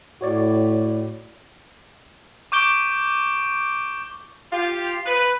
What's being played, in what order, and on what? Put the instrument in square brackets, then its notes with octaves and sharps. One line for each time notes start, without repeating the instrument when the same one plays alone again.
[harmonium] A2 [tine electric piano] F#4 C#5 D5
[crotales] C#6 D6 G6 D7 G7
[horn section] F4 G4
B4